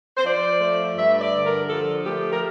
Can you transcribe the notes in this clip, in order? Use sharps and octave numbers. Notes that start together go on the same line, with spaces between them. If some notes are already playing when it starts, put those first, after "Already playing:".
C5
F3 D5
A3
G2 E5
D5
D3
A#4
F3 A4
A3 G4
A#4